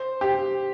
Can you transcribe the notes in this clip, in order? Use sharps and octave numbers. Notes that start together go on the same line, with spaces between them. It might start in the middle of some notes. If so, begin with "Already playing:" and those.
Already playing: C5
G4